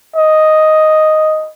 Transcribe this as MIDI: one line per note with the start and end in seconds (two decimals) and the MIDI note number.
0.16 1.51 75